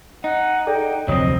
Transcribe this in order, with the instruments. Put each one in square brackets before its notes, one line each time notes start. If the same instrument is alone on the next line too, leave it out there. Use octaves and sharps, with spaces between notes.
[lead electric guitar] D#4 [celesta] D#5 [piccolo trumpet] F#5
[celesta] G#4 A4 D5 [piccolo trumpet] G5
[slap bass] F1 D2 F3 [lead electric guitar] F#3 C4 [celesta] C#5 [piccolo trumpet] D#5